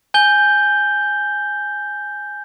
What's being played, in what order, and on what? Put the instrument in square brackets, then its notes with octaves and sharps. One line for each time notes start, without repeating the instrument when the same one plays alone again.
[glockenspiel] G#5 G6 G7